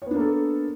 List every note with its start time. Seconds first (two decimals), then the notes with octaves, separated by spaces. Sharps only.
0.02 C#5
0.06 B3
0.11 D4
0.15 A#3
0.20 A4